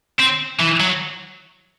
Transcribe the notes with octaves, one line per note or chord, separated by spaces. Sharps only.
C4
E3
F#3